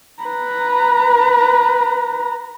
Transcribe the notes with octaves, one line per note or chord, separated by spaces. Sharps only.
B4 A#5